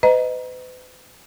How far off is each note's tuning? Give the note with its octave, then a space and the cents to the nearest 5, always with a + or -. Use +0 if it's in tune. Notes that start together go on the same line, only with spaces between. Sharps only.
B4 +40 D#5 +0 A#5 +25